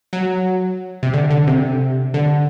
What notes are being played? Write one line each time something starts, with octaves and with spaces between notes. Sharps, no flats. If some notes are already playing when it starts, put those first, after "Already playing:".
F#3
C3
D3
D3
C3
D3